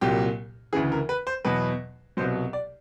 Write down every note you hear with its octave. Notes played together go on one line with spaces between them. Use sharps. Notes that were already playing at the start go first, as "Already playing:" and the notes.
C2 A#2 F#3 G4
D2 C#3 E3 G#4
A#4
B4
C5
E2 B2 F#3 B4
C2 B2 F#3 C5
D5